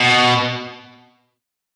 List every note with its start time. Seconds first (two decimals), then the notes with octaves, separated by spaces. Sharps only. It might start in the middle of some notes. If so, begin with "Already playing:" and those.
Already playing: B2